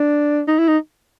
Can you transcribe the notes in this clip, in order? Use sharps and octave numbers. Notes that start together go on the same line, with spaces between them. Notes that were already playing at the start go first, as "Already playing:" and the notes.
Already playing: D4
D#4
E4
D#4